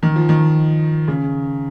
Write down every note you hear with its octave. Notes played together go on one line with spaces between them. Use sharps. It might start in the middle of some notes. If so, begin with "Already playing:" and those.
D#3
F3
D#3
C#3